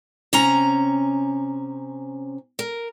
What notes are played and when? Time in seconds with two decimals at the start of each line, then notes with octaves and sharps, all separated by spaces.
0.33 C3 C#4 A#5
2.59 A#4